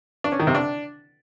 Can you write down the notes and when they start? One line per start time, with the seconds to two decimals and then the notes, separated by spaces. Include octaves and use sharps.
0.24 D4
0.32 C#4
0.40 D#3
0.47 C3
0.55 D4